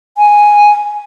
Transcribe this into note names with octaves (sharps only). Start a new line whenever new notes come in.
G#5